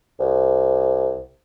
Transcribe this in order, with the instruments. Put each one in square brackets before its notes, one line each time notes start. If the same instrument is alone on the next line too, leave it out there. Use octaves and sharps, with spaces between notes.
[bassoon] C2